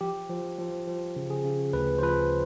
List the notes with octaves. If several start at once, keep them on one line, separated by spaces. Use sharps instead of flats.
F3 G4
F3
F3
F3
C#3
G#4
C#3
D2 B4
C5
F3 B4